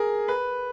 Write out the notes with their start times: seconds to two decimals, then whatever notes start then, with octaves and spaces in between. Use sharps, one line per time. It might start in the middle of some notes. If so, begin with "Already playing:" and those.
Already playing: G#4 A#4
0.28 B4